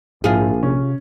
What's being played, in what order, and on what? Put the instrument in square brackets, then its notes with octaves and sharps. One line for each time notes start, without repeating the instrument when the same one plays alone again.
[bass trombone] A#1 [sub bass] G#2 [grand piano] F3 E4 [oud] F4 G#4
[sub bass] C3 [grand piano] C#4